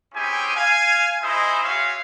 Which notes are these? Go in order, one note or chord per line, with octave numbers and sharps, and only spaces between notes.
C4 C#4 E4 G4 G#4 G#5
F5 G#5
D#4 E4 G#4 C5 D#5 E5
F4 F#4 G#4 C#5 E5 F5